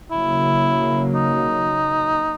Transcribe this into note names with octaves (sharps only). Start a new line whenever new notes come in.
C#3 F#3 A#3 E4
D#4